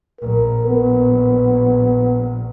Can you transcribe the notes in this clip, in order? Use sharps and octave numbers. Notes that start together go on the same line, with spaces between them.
A#1 A#4
B3